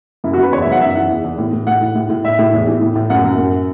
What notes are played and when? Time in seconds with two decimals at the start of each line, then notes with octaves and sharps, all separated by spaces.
0.24 F#2 E4
0.33 F#4
0.38 F#2 B4
0.53 E2 C#5
0.62 E5
0.67 F#3 F#5
0.81 F#2 E5
0.96 E3 F#5
1.10 E2
1.24 E2
1.38 A2
1.53 A2
1.67 A2 F#5
1.81 A2
1.95 A2
2.10 A2
2.24 A2 E5
2.39 A2
2.53 E2
2.67 E3
2.81 A2
2.95 A2
3.10 F#2 F#5
3.24 F#2
3.38 F#2